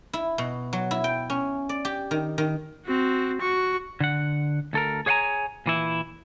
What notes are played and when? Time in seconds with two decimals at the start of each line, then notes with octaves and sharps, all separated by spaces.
0.13 E4
0.38 B2
0.73 F#3
0.91 E4
1.04 G5
1.30 C#4
1.69 D5
1.85 G4
2.11 D#3
2.38 D#3
2.86 C4 F#4
3.41 F#4 C#6
4.00 D3 F#5
4.73 D2 A4 A#4
5.06 G#4 C#5 F5 F#5 G#5 A#5
5.66 A#2 E3 E4